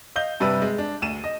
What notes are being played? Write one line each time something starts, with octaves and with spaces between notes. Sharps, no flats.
D#5 F5 G6 G7
G2 C3 G3 B4 E6
G#3
D4
D2 D#7 E7
D#5